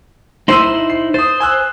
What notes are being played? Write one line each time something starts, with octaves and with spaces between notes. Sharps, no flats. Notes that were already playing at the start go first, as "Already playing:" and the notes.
D#4 E4 C5 C6 E6 D#7
C7
C5 D#6 A6
G#5 E6 F#6